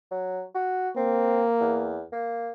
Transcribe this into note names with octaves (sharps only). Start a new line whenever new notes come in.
F#3
F#4
A#3 C4
E2
A#3